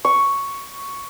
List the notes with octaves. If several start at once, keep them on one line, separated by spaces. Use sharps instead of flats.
C#6